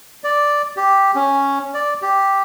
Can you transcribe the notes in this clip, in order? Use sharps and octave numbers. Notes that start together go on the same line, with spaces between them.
D5
G4
C#4
D5
G4